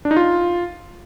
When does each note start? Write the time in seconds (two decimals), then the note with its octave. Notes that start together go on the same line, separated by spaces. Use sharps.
0.05 D4
0.11 D#4
0.17 F4